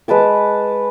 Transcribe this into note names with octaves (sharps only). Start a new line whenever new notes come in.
G#3 B4 A5 D6